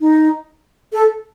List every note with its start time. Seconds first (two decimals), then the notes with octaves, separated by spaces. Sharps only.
0.01 D#4
0.93 A4